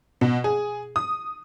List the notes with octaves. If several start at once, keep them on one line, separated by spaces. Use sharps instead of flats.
B2
G#4
D#6